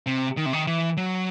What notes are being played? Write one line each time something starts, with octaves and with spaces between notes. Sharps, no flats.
C3
D#3
C3
D#3
E3
F#3